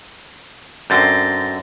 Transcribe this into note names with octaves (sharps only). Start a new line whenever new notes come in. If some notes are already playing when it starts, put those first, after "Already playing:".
F#2 D3 C4 G6 A6 A#6